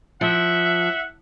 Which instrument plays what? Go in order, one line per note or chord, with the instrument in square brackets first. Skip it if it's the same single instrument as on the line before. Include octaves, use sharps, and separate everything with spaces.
[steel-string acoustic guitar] F3 [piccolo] E5 [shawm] F#5